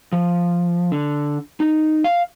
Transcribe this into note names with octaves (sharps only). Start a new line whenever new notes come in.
F3
D3
D#4
F5